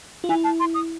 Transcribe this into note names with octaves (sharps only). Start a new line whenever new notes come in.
F4
E4 G#5
A5
C6
D#6